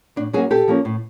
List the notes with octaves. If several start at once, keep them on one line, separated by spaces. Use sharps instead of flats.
A2 D4
F#3 A#3 C#4 F#4 G#4
A#2 G4 A4
F3 A#3 C#4
A2